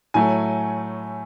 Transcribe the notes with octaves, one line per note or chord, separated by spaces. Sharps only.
A2 F#3 A3 G#5